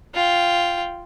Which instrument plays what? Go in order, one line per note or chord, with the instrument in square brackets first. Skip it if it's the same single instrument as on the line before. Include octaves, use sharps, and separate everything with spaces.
[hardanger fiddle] F4 G5